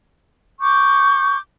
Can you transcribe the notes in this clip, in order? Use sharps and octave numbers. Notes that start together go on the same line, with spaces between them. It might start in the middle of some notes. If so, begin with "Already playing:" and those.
C#6 D6 G6